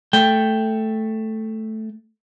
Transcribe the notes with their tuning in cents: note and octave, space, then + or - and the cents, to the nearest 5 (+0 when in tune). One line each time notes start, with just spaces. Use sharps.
A3 +0 G5 +0